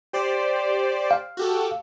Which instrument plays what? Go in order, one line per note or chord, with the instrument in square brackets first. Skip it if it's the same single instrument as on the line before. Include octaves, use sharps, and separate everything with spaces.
[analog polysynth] G4 C5 D5
[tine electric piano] F5
[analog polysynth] F#4 G4 A4